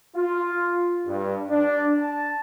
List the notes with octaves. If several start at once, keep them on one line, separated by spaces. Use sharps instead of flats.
F4
G2
D4
A5